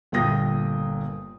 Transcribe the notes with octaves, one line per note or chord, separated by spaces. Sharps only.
G1 A#2 A#3 G5 D#6 A#6